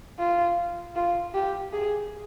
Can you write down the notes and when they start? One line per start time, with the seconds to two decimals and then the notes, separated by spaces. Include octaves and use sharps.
0.19 F4
0.96 F4
1.34 G4
1.73 G#4